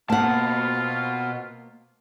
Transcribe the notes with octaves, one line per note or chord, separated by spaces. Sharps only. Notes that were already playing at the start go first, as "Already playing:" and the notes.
B2 A#3 C4 F4 F#5 A5